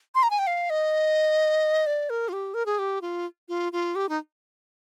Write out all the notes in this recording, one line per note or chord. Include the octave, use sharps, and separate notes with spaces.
C6
A#5
G#5
G5
F5
D#5
D5
A#4
F4
G4
A#4
G#4
G4
F4
F4
F4
G4
D#4